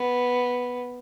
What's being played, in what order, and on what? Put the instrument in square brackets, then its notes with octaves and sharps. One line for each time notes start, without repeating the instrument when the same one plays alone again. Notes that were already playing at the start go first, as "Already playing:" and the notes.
Already playing: [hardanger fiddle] B3